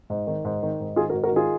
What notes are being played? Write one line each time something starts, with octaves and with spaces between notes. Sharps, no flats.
G#2
D#3
G#2
D#3
G#2
D#3 F4 G#4
F#4 A#4
G#2
F#4 A#4
D#3 F4 G#4